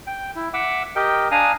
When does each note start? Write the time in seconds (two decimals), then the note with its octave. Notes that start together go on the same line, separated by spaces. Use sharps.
0.07 G5
0.36 E4
0.54 E5 F#5 D6 E6
0.96 G4 A#4 D#5 G5
1.31 D4 F5 G#5 A#5 D#6